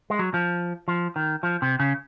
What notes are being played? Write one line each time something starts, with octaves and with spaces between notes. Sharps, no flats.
G#3
F#3
F3
F3
D#3
F3
C3
C#3